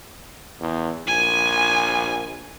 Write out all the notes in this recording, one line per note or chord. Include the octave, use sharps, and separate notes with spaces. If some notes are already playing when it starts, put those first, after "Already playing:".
E2
A#1 G#5